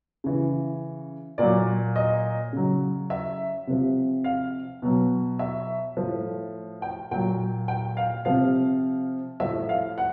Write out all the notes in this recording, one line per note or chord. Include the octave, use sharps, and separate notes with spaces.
C#3 E3
A#2 F#3 D5
D#5
C#3 F#3
E5
C3 F3
F5
B2 F#3
E5
A2 F3
G5
A#2 F#3 G5
G5
F5
C3 F3 F5
A2 F3 E5
F5
F#5